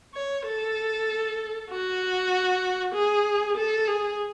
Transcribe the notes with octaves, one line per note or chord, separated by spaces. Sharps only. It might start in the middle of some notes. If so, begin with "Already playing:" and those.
C#5
A4
F#4
G#4
A4
G#4